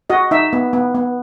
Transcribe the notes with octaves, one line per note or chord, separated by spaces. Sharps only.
F#4 D#5
D#4 E5
B3
B3
B3